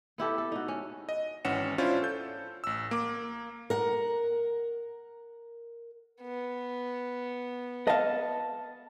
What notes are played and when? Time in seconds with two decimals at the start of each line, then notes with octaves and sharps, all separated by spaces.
0.18 B3 E4 G4 A4
0.38 A4
0.52 D#4 F#4
0.68 C#4
1.09 D#5
1.45 G#1 E3 C#4 F#5 C#7 E7
1.78 C#4 D4 E4 F4 C5
2.02 A4 G6
2.64 A1 E6
2.91 A#3 D6
3.70 A#4 F#5
6.22 B3
7.87 D#5 F5 A5